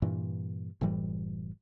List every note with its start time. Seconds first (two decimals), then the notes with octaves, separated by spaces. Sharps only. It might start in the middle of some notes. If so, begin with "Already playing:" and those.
0.02 G2 A#2 E3
0.81 F#1 A2 E3 G3